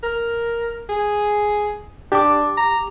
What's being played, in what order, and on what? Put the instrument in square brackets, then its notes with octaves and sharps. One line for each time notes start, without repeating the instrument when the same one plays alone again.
[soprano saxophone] A#4
G#4
[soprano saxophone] D4 [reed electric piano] G4 D6
[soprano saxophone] A#5